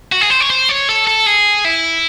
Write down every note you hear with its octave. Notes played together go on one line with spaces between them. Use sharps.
F#4
G#4
C5
C#5
C5
C#5
A4
A4
G#4
E4